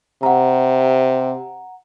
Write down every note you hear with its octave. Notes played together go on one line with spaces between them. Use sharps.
C3 F#5 A#5